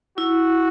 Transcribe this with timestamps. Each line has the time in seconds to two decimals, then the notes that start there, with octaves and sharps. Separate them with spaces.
0.18 E4 F#4